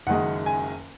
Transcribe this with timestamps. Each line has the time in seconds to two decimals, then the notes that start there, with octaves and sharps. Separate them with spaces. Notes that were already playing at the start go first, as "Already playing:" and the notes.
0.07 F#1 F#2 D#3 G#3 F#5
0.46 G#5